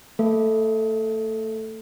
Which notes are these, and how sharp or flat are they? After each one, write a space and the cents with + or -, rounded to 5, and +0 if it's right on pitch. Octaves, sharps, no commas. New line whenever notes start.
A3 +30 A4 +0 E5 +35